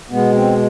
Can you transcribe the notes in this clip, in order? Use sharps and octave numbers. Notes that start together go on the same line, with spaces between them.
B2 G#3 B3
C4